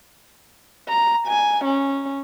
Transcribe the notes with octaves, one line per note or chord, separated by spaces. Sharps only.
A#5
G#5
C#4